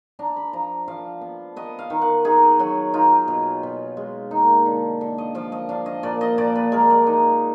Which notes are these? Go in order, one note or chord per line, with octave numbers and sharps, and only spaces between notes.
D4 A#5
B5
F3 A#5
F3 F5
B3
B3 D#5
F5
D#3
F#5
D#4 G#4
F#3 F#4
D#4 F4
B2
B2
G#3
A#3 D#4
D3
D3
D#5
F3 F5
D#5
D4 F5
D#5
A#2 D5
D#5
A#2 D5
B4
G#3 A#4
D5
D#4 D#5